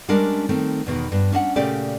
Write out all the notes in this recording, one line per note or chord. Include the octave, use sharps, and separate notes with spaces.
G3 G#3 C#4 D4 A#4
D#3 A3 C4
E2 B2 D3 D#3
G2
C#4 D4 D#5 F#5
A#2 C#3 A3 C#4 G4 D5